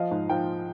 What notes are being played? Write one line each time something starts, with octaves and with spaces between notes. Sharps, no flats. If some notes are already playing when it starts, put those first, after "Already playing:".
Already playing: F3 D#5 F5
G#2
F3 F5 G5